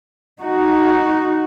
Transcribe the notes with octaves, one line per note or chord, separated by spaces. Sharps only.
D#4 F#4